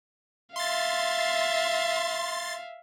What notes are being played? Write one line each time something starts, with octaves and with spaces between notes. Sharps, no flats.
E5 F5 C6 A6